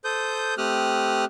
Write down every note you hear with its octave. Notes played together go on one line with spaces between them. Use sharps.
A4 C5 D#6 G6
A3 C4 G4 D#6 F6 F#6